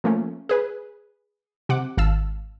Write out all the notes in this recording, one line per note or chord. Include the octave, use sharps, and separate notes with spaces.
F3 A3 A#3 C#4
G#4 B4
C3 F#5 D6
G#1 F5 A5 E6